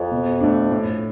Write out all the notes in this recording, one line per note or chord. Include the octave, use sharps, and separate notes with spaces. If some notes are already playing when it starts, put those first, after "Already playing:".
Already playing: F2
B2
A3 D4
A2